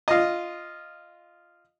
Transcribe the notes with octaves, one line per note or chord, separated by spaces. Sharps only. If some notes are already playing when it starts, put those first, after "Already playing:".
F4 D#5